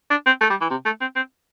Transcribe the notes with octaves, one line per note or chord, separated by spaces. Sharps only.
D4
C4
A3
G3
E3
C3
A3
C4
C4